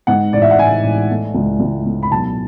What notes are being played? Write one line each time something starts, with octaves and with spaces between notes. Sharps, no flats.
G#2 F#5
A1 D5
E5
F#5
A1 G#5
A1
A3
C#2
C#2
A3
B5
B1 A5